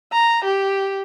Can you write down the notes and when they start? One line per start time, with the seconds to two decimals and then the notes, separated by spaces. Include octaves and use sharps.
0.13 A#5
0.45 G4